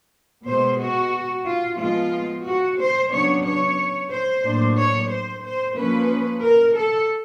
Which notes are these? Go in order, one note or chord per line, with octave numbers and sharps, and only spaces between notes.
B2 G#3 B3 C5
F#4
F4
F3 G#3 B3 F4
F#4
C5
C#3 F#3 B3 D4 C#5
C#5
C5
A2 F#3 A#3 D4
C#5
C5
C5
F3 A#3 C#4 B4
A#4
A4